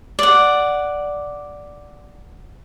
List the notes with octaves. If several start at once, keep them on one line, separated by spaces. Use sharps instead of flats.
D5 F#5